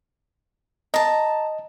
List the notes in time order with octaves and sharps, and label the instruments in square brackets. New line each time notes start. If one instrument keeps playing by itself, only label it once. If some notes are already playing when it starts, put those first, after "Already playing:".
[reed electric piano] D#5 [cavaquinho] A5 A#5